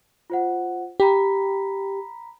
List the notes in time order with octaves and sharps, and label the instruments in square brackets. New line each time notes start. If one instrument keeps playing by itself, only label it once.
[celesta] F4 C5 F#5
[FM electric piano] G4 [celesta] A#5 B5 B6